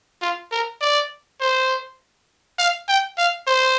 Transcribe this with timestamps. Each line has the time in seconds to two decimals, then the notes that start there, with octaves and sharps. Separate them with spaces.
0.22 F4
0.52 A#4
0.81 D5
1.40 C5
2.59 F5
2.88 G5
3.18 F5
3.47 C5